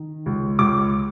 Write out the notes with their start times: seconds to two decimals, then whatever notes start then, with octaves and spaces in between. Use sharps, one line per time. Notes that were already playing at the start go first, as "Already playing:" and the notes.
Already playing: D#3
0.26 C#2
0.59 C#2 D6